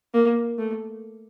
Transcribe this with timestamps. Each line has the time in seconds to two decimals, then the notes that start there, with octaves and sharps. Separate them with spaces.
0.14 A#3
0.59 A3